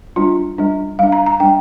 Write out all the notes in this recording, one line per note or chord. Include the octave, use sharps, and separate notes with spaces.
G3 D4 F4
G3 D4
G3 D4 F5
A#5
A#5
G3 D4 G5